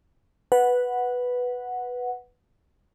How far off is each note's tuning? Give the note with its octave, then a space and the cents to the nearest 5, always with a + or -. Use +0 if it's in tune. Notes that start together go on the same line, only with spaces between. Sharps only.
B4 +0 F#5 -5